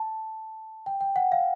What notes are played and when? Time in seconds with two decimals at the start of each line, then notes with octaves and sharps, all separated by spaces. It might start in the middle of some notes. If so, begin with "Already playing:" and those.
Already playing: A5
0.86 G5
1.01 G5
1.16 F#5
1.32 F5